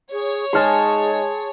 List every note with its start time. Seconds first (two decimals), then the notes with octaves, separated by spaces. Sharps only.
0.12 G#4 C#5
0.53 G#3 D#4 G#4 G#5 A5 C6 F6